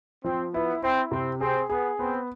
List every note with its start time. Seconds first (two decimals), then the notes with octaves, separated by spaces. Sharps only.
0.24 F3 C4
0.54 B3 E4
0.82 C4 E4
1.12 C3 C4
1.41 C4 G#4
1.69 B3 G#4
1.99 B3 C4